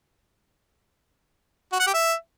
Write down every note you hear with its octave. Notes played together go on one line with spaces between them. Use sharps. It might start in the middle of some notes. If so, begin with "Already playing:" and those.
F#4
F#5
G4
E5